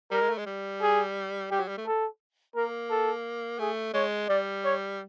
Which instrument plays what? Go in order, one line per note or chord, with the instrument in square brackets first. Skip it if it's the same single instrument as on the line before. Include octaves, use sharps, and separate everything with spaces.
[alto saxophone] G3 [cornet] A#4
[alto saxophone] G#3
A3
G#3
G3
[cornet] G#4
[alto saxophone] G3 [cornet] G4
[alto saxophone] F#3
G3
A3
[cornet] A4
[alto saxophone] A#3 [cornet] A#4
[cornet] A4
[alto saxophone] A3 [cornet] G#4
[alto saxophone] G#3 [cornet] C#5
[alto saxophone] G3 [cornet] D5
[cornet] C#5